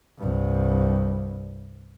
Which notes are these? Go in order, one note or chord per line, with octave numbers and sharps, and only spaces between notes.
C2 G2